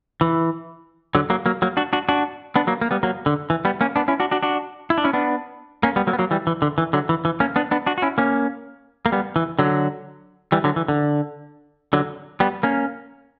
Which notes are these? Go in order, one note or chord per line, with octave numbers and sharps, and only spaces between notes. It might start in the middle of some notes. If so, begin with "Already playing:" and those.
E3
D3 F#3
F#3 A#3
F#3 A#3
F#3 A#3
D4 F#4
D4 F#4
D4 F#4
B3 D4
F#3 A#3
A#3
G3 B3
F#3 A#3
D3
E3
G3 B3
A#3 C#4
B3 D4
C#4 E4
D4 F#4
D4 F#4
D4 F#4
E4
D4
C#4 E4
B3 D4
A#3 C#4
G3 B3
F#3 A#3
B3
F#3 A#3
E3 G3
E3
D3
E3
D3 F#3
E3
E3
A#3 C#4
B3 D4
B3 D4
D4 F#4
F#4
C#4 E4
A#3 C#4
A#3
G3 B3
E3
D3 F#3
E3 G3
D3 F#3
E3
D3
D3 F#3
G3 B3
A#3 C#4